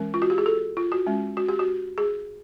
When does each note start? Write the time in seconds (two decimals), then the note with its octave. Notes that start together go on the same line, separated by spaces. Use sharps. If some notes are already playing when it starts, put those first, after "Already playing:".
Already playing: E3 G#3 C#4 A#4
0.14 F4
0.22 F#4
0.30 G4
0.38 G#4
0.46 A4
0.77 F4
0.92 F#4
1.07 G#3 C#4
1.37 F#4
1.48 G4
1.59 F#4
1.98 G#4